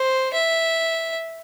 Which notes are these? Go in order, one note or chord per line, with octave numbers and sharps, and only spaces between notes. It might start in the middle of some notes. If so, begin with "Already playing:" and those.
Already playing: C5
E5